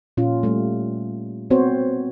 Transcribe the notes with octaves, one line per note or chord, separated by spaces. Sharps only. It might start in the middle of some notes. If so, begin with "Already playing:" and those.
A#2 C#4 F4
G3 A3
B3 C4 F#4 C5 C#5